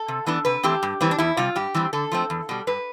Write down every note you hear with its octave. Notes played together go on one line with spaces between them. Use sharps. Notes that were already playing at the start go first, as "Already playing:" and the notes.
Already playing: A4
C3
E3 B3 D4
C3 B4
E3 A3 C4 G4
G2
E3 G3 C4
D4
E2 E4
C3 G3 F4
G2 G4
E3 G3 C4
D3 A4
F3 A3 C4
E2
B2 G3
G2 B4